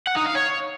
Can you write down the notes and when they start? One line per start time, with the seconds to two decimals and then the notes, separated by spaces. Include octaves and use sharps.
0.07 F#5
0.16 D#4
0.26 F5
0.35 C#5